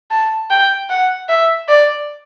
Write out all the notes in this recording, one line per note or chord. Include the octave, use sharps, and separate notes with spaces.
A5
G5
F#5
E5
D5